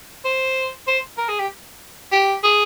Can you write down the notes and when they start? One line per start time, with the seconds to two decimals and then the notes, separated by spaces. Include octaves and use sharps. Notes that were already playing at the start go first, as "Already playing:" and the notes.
0.25 C5
0.87 C5
1.18 A#4
1.29 G#4
1.39 G4
2.12 G4
2.44 G#4